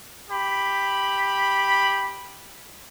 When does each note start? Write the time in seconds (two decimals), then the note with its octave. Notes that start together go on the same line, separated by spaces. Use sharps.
0.31 G4 B5